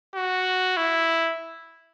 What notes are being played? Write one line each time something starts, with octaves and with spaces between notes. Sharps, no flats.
F#4
E4